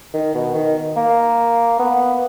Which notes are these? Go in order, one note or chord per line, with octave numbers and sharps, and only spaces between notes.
D#3
B2
D#3
A#3
B3